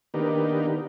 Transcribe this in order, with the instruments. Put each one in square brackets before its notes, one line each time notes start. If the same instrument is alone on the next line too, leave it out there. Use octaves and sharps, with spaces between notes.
[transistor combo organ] D#3 A#3 B3 D4 D#4 G4